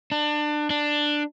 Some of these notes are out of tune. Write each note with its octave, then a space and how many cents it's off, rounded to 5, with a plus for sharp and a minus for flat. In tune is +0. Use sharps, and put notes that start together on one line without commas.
D4 +25
D4 +10